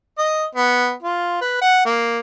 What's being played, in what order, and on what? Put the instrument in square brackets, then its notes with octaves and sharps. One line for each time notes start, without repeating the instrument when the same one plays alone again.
[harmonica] D#5
B3
F4
B4
F#5
A#3